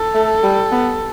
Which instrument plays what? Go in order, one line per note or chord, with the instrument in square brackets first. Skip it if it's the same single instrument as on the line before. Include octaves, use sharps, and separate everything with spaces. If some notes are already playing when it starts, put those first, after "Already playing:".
Already playing: [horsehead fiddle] A4
[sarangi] A3
G3
B3